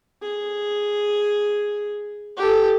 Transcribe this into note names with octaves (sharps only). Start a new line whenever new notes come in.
G#4
G4 A4